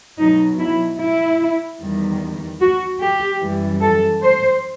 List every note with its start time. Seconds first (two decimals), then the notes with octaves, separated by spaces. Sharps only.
0.19 B2 F#3 D#4
0.59 E4
1.00 E4
1.81 E2 D#3 G3
2.61 F#4
3.01 G4
3.42 F#2 E3 G3
3.82 A4
4.22 C5